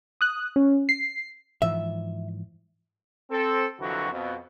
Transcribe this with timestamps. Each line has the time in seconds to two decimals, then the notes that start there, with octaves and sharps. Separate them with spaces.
0.21 D#6 F#6
0.56 C#4
0.89 C7
1.62 G#2 E3 F3 E5
3.30 C4 A4
3.79 C2 F2 D3 E3 F#3 F#4
4.11 F2 B2